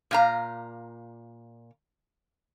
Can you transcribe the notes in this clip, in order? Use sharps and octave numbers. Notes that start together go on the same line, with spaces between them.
A#2 F5 A#5